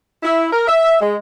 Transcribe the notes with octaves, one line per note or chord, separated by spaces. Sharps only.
E4
A#4
E5
G#3